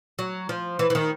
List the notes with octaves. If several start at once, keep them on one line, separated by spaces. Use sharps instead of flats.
F#3
F3
E3
E3
D#3